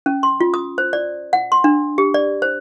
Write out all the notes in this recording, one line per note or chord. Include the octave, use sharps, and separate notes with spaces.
C#4
C6
F4
D#6
C5
D5
F#5
C6
D4
G4
D5
C5